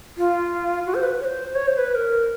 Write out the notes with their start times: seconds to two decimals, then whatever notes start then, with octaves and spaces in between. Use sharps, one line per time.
0.18 F4
0.86 F#4
0.95 C5
1.03 B4
1.21 C#5
1.25 C5
1.55 C#5
1.67 C5
1.78 B4
1.90 B4
1.95 A#4